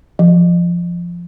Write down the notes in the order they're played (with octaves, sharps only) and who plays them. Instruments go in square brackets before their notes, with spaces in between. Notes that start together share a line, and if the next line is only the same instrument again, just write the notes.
[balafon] F3